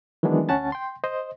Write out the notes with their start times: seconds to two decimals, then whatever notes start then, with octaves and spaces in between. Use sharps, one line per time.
0.23 D#3 E3 F#3 G#3 B3 D4
0.49 D2 C#4 F#5 A5 A6
0.72 G5 C6
1.04 C5 D#5